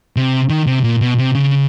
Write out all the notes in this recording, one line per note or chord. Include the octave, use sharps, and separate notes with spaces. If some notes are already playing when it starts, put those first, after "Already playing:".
C3
D#3
C3
A#2
B2
C3
C#3